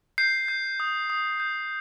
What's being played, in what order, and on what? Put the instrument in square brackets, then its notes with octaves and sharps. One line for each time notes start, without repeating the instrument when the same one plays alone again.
[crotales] G6 C7
G6
D#6
D#6
G6